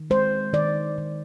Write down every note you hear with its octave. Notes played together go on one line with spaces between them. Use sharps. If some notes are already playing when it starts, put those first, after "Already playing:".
Already playing: D#3
G#3 C5
D#3 D5
D#3